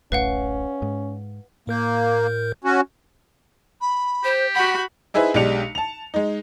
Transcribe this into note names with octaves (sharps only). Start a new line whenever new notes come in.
D1 A1 A2 C#4 B4 F5 F#5
G#2
A2 A#3 A#4 G6
C#4 F#4
B5
G4 C5
F#4 F#5 B5 G6
D#4 E4 G#4 B4 C5 E5
B1 G#3 D4 G4 C#7 F7
A5 F7
G#3 D#4